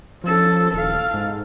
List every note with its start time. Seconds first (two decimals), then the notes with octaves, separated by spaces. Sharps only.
0.24 F3 C#4 A4
0.74 D#1 A4 F5
1.14 G#2